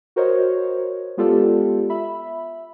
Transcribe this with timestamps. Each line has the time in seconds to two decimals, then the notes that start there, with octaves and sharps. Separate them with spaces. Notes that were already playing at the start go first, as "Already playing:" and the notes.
0.16 F#4 A#4 C5 C#5 D#5
1.17 G#3 B3 F4 G4 A4 D5
1.90 E5 B5